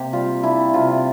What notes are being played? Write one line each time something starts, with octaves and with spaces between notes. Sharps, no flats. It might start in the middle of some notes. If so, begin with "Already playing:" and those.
Already playing: C3 A#3 G4
G3 F4
D4 E4
C3 F4